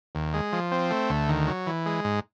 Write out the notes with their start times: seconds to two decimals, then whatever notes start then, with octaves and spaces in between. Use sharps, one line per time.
0.15 D#2
0.34 G#3
0.53 F3
0.72 C4
0.91 A3
1.10 D2
1.29 D#3
1.47 F#3
1.67 E3
1.86 G#3
2.04 G#2